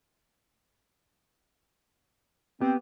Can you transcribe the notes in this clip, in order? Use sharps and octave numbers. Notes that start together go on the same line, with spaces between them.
B3 C4 G4